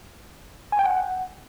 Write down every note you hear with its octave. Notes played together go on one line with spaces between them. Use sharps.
G#5
G5
F#5